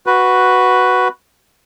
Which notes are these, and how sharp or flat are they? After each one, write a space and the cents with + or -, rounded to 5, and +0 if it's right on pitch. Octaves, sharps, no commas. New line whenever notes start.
F#4 +0 B4 +0